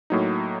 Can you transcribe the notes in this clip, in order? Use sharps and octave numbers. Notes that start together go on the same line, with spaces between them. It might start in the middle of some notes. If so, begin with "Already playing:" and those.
A2 F#3 A#3 D#4